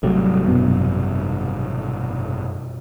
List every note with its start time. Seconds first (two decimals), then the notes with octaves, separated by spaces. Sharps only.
0.03 G#1 C3 F#3 G3 A3
0.46 F#2 B2